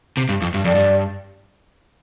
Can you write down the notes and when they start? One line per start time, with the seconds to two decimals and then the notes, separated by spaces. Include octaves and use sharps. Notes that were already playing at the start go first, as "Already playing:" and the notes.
0.17 C3
0.29 G2
0.42 F2
0.54 G2
0.65 F2 D5
0.75 G2